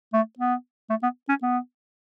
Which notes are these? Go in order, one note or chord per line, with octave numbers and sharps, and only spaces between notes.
A3
B3
A3
B3
C#4
B3